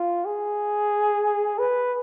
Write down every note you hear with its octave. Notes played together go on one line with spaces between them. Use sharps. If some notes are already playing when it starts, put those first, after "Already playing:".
Already playing: F4
G#4
B4